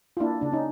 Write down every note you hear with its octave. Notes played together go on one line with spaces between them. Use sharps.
F4
A#3 D4 E4
C#3 D4
C#4 D#4